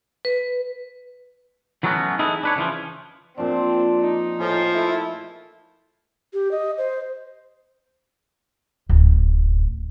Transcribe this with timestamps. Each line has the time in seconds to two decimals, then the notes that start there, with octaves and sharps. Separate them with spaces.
0.25 B4
1.83 E3 F#3 A3 B3 C#4 F#4
2.19 D#4 E4 G#4 A4 B4
2.43 D4 B4 C#5
2.56 C#3 E3 F3
3.38 A#2 F3 C4 D4
4.01 D#4
4.40 A2 F3 G#4
4.74 A3 E4
6.34 G4
6.51 D#5
6.78 C5
8.89 D1 A1